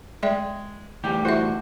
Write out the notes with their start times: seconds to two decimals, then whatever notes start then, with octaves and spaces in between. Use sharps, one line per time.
0.23 G#3 D5 E5 G5
1.04 A2 E3 G3 G4
1.25 E4 F#4 G#4 C5 E5